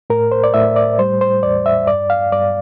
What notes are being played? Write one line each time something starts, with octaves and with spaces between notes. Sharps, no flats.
A2 A#4
C5
D5
A2 E5
D5
G3 C5
C5
E2 D5
E5
G2 D5
F5
G2 D5